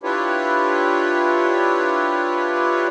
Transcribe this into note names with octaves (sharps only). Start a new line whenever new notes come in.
D4 E4 F4 G4 B4 C#5